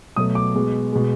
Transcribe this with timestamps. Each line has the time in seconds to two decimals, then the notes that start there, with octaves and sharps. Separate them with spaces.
0.16 B2 F#3 A3 D#6
0.35 D6
0.55 B2 G#3
0.92 B2 G#3